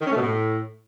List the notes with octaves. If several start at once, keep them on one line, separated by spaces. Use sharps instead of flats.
D#3
C#4
A3
B2
A2